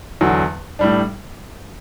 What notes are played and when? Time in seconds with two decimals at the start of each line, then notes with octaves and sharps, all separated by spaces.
0.21 E2 D3 F#3
0.79 A2 G3 D4